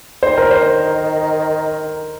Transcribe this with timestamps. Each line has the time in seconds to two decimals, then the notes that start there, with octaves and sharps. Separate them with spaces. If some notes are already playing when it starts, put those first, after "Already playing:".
0.23 D#3 C5
0.38 A#4
0.51 C5